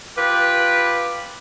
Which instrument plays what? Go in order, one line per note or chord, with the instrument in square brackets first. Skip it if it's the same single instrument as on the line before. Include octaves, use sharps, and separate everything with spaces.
[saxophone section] F4 G4 B4